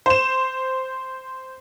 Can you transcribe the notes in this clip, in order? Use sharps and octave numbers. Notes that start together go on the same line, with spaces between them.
C5 E7